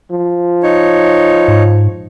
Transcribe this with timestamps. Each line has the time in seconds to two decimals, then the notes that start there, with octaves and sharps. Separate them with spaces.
0.11 F3
0.63 D#4 C#5
1.48 G#2